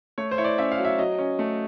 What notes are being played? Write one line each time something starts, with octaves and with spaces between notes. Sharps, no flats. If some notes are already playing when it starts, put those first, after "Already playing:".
A3 C#5
C5
E4 C#5
D5
C#4 E5
F5
F#3
E5
F#3 D#5
C#4
A3